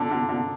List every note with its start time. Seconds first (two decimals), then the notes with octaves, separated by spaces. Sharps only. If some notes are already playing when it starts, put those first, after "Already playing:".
Already playing: D3
0.11 D3
0.29 D3